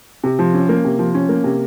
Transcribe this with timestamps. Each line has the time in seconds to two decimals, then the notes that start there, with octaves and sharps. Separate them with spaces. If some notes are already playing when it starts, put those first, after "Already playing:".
0.24 C3
0.39 F3
0.54 C#4
0.69 A#3
0.85 C3
0.99 F3
1.15 C#4
1.29 A#3
1.44 C3